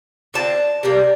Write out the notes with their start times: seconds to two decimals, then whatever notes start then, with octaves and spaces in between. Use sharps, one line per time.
0.34 D3 F3 C4 A5
0.83 C3 G3 A#3